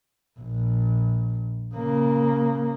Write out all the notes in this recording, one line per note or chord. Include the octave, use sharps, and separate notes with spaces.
A#1
C#3 A#3